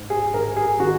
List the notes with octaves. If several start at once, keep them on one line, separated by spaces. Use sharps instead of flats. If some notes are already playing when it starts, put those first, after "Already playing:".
Already playing: G#2
G#4
G#2 A#4
G#4
D#3 F#4